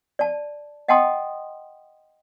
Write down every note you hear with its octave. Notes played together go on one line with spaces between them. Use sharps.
D5 A5
D#5 F#5 G5 A5 C6 D#6